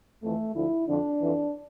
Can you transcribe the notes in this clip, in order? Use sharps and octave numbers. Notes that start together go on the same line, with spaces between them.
F2 E3 A3
D2 D3 F3 E4
F2 D3 F3 D4
F2 E3